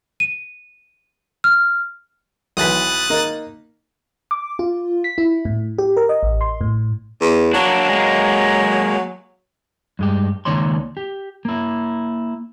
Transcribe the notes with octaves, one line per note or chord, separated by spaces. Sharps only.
D#7
F6
B1 E3 B4 D#6 F#6 A6
A#3 D#4
D6
F4
B6
E4
A2
G4
A#4
D#5
A1
C6
A2
E2
F#3 A#3 D4
G#3 A#3
G2 G#3 G4
C#2 D#3 A#3 C#5 D5 C6
G4
A#3 E4